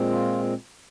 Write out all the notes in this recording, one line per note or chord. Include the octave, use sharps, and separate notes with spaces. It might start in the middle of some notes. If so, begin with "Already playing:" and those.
Already playing: A#2 G#3 C4
F4